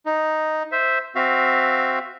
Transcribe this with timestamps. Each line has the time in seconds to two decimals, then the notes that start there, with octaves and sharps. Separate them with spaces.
0.06 D#4
0.72 C5 E5
1.15 C4 F#4 E5 F5